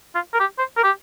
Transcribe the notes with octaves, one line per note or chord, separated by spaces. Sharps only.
F4
A#4
G4
C5
A#4
G4